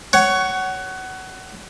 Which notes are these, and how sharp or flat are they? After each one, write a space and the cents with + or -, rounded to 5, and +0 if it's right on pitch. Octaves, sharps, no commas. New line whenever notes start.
C#5 +10 F#5 +25